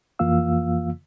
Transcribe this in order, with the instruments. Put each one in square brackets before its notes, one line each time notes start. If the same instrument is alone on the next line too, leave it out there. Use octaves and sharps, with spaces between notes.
[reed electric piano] F2 E3 A#3 F4 F5 E6